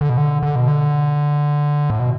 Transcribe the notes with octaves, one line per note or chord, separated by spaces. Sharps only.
D3
B2
D3
D3
B2
D3
A2
B2